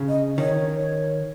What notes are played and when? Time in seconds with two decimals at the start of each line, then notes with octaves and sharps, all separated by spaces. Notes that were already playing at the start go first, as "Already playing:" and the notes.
Already playing: C#3
0.08 D#5
0.37 D#3 C#5